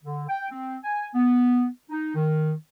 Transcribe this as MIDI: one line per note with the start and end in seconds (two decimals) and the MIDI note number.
0.04 0.24 50
0.29 0.45 79
0.50 0.76 60
0.84 1.07 80
1.15 1.66 59
1.90 2.11 63
2.15 2.52 51